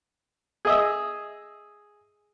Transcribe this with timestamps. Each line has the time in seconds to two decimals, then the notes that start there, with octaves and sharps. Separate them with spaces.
0.65 G#4 D#5 E5